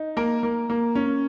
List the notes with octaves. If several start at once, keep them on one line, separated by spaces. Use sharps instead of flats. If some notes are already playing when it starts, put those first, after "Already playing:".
Already playing: D#4
A#3 A#4
A#3
A#3
C#4